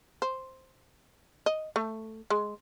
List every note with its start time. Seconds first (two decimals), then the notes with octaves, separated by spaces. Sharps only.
0.22 C5
1.46 D#5
1.76 A3
2.30 G#3